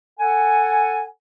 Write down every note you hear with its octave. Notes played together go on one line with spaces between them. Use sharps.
A4 F#5 G#5